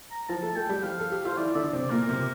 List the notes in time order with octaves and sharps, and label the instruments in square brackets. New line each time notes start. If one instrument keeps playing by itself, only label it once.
[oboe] A#5
[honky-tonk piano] F3 F4 [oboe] A5
[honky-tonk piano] A3 A4
[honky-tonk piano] A3 A4 [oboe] G5
[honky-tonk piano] G3 G4
[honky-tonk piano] F3 F4 [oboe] F5
[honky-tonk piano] A4
G4
[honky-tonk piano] F4 [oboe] C5
[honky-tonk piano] E3 E4 [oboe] D5
[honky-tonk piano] D3 D4 [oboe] E5
[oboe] D5
[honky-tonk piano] C3 C4
[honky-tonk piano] A#2 A#3 [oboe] A#4
[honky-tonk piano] C3 C4